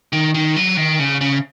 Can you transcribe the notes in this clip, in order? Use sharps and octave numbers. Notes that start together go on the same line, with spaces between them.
D#3
D#3
F#3
D#3
C#3
C#3